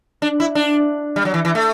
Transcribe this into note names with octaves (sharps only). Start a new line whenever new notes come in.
D4
E4
D4
G3
F#3
E3
E3
A3